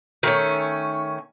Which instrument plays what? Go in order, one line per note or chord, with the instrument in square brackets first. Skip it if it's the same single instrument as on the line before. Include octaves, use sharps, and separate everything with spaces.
[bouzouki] D#3 A3 C#4